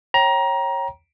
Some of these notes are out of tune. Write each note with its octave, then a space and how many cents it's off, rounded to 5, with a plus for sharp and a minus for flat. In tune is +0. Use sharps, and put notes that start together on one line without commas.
C#5 -20 G5 -15 A#5 +20